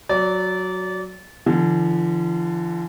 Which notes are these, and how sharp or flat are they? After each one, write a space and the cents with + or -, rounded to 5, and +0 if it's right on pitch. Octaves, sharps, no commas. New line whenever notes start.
F#3 +0 D5 -25
D3 +10 F3 -45